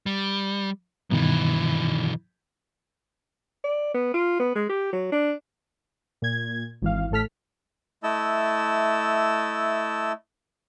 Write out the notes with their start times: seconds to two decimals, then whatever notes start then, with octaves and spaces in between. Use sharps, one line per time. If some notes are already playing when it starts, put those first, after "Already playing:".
0.06 G3
1.10 B1 G2 B2 D#3 E3
3.64 D5
3.94 B3
4.14 F4
4.39 B3
4.55 G#3
4.69 G4
4.93 F#3
5.12 D4
6.22 A#2 G#6
6.82 G#1 E3 F5
7.11 A1 A2 A4 F6 B6
8.03 A3 E4 D#5 A5 E6